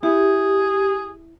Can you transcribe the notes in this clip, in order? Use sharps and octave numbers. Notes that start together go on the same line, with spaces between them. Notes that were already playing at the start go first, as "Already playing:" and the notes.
E4 G4 G#4